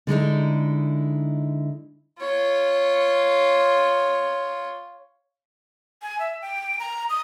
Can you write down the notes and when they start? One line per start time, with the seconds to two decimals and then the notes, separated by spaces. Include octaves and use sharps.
0.07 D3 G#3 D#4 E4
2.19 F4 C#5
6.01 G#5
6.19 E5
6.42 G5
6.79 A#5
7.09 D#6